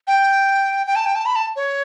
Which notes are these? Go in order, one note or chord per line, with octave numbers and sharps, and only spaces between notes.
G5
G5
A5
G5
A5
B5
A5
C#5